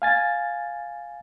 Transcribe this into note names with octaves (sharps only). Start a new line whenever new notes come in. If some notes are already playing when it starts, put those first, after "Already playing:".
F5 G#5 A6